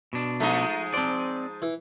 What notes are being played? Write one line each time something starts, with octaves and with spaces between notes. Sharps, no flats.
B2 D4
F3 G#3 A3 D#4
C4 C5 D5 A5
E3